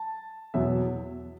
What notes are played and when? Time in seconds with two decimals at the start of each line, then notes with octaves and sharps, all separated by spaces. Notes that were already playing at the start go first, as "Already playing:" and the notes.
Already playing: A5
0.54 E2 B2 F#3 E5